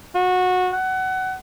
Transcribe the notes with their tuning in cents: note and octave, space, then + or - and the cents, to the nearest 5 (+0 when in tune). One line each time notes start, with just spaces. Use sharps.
F#4 -20
F#5 +20